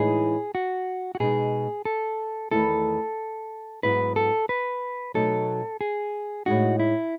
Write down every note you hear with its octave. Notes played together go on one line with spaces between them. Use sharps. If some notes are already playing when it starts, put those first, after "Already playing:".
Already playing: A2 E3 G#3 D#4 G#4
F#4
F#4
B2 G#3 D#4 G#4
A4
E2 D#3 A3 E4 A4
G#2 F#3 B3 E4 B4
A4
B4
B2 F#3 A3 D#4 A4
G#4
A2 G#3 D#4 F#4
E4